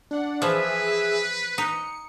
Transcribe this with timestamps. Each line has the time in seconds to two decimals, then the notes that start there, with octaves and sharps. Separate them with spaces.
0.11 D4 F#5
0.42 E3 F3 G#4 B4 E5
1.58 D#4 C#7